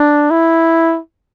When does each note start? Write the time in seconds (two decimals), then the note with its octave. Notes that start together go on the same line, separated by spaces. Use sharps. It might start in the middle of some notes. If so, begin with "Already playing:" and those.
Already playing: D4
0.31 E4